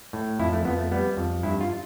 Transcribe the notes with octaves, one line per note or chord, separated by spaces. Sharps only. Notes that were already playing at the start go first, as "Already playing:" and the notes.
A2
F2 E4
A3
F2 B3
A3
G3 B3
F2
G2 E4
F4